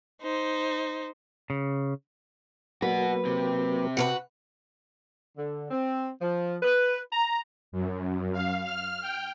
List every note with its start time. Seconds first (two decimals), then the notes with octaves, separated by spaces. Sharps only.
0.22 D#4 C5
1.50 C#3
2.82 F#3 A#3 B3 F#4 B4
3.25 C3 C4
3.97 F#4 A#4 B4
5.36 D3
5.70 C4
6.20 F3
6.62 B4
7.13 A#5
7.72 F#2
8.33 F5
8.62 F6
9.01 G5